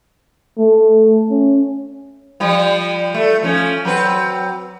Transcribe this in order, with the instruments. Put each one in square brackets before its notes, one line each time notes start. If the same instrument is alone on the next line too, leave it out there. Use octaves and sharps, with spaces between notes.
[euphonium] A3
C#4
[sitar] F3 G3
A3
F3 C#4
F#3 C4 B4